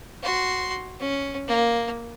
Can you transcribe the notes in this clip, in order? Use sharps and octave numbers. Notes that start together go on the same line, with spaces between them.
F#4 C6
C#4
A#3